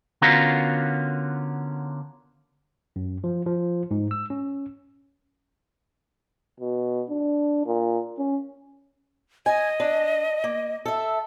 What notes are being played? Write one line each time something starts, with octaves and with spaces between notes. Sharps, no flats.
D3 B3 C#4 F4 F#4 A#4
F#2
F3
F3
G#2
E6
C#4
B2
D4
A#2
C#4
D#5 G#5
D4
A#3
A4 E5